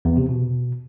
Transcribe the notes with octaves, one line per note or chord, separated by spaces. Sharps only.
E2
C3
B2